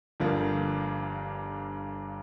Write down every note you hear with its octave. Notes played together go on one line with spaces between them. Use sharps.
G1 G2 D3 F3 A#3